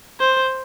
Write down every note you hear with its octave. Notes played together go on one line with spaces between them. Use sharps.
C5